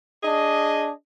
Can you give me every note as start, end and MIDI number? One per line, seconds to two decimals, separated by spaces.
0.24 0.90 62
0.24 0.90 68
0.24 0.90 75